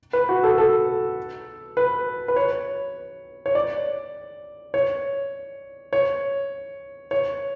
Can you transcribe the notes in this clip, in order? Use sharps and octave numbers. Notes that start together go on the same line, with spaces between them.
B4
F#4
A4
A4
B4
B4
C#5
C#5
D5
C#5
C#5
C#5